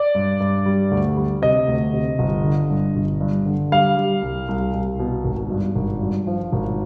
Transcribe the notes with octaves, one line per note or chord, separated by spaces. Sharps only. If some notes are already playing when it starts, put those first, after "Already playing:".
Already playing: D5
G2
G2
G3
D2
G3
C3 D#5
D2
C3
G1
D3
G2
G1
G2
D3
G3 F5
G3
C2
C2
C2
B2
G#1
G2
G#1
G2
F3
G#1